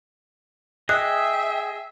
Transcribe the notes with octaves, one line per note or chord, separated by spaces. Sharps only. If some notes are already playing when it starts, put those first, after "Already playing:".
G#4 D#5 E5 G5 D#6 F#6